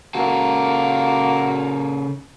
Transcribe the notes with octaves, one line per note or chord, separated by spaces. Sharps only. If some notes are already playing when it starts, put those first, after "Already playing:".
C#3 A#3 F#4 A4